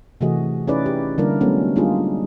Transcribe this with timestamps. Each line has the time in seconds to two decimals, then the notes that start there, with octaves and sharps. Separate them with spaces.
0.21 C3 E3 A3 F#4 G#4 D#5
0.68 C#4 D#4 E4 G#4 B4 D5
0.86 G4
1.18 D3 G3 A#3 D4 E4 A#4
1.41 F#3 G#3 A3 B3 C#4
1.76 G3 A#3 D4 D#4 F4 G#4